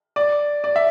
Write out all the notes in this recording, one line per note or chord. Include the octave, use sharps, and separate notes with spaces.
D5
D5
E5